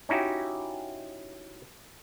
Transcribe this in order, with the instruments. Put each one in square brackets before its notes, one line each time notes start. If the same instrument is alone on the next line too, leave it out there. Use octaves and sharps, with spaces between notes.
[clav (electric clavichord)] C#4 D#4 E4 F#4 G4